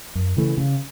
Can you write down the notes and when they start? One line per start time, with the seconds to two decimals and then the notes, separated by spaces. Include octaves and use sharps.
0.15 F#2
0.37 C#3 E3 A3
0.57 C#3